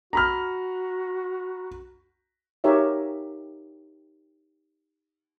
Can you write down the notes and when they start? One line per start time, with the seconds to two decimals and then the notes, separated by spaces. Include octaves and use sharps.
0.13 F#4 A#5 B5 F6
2.64 D#4 G4 A#4 C#5 E5